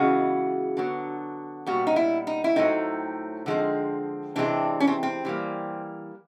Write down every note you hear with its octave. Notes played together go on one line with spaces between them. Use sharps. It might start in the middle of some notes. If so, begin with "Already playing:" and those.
Already playing: C#3 E3 G#3 B3 F#4
D3 F#3 B3
A#2 G3 B3 F#4
D#4
E4
D#4
E4
A2 F#3 A3 C4 D#4
D3 F3 G#3 C4
C3 E3 G#3 C4 D4
C#4
C4
C4
E3 G3 A#3